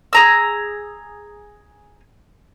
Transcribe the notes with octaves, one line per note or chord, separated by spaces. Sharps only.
G#4 A#5 E6